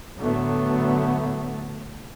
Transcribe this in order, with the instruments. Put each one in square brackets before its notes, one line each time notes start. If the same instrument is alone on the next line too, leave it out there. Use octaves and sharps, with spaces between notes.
[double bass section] A2 D3 F#3 A3 B3